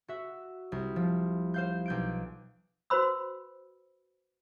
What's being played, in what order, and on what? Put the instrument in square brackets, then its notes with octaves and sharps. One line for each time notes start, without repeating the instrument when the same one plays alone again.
[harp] F#4 E5
C2
F3
C5 F5 G6
B1 G6 D7
[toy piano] F#4 B4 C5 B5 E6